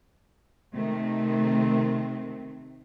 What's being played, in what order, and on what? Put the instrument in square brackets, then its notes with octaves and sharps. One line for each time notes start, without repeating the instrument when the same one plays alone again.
[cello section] C3 D#3 A3 C4